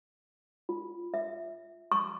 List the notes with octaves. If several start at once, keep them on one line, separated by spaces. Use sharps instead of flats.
F4
E5
C#6